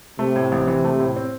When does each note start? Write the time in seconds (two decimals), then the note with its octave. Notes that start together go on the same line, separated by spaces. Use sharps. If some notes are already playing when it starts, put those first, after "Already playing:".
0.19 C3 A3
0.36 A2
0.52 A1
0.67 E3
0.84 A3
1.00 A2
1.16 C4